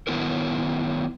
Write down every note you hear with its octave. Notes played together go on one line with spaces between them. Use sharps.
D#3 F#3 B3 E4 A#4